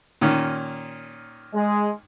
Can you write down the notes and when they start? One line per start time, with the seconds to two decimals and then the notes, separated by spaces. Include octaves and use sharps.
0.21 A#2 D#3 C#4
1.54 G#3